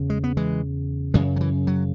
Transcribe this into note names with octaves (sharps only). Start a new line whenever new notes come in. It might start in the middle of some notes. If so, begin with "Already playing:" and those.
Already playing: E2 C#3
G#3
B3
E3 G#3
F#2 C#3 E3 G#3
F#3
E3
F#3